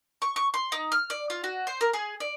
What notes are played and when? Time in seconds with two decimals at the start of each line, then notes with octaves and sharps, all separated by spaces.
0.22 C#6
0.36 C#6
0.54 C6
0.72 D#4
0.92 F6
1.10 D5
1.30 F4
1.44 F#4
1.67 C5
1.81 A#4
1.93 G#4
2.20 D5